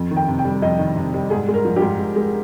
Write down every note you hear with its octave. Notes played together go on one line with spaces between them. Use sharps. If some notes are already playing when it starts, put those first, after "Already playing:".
Already playing: F2
D#3
G5
C3
G5
G3
F2 D#5
D#3
C3
G3
G#2 G#4
G#3
A#4
F3
G4
G#2
G#2
G#3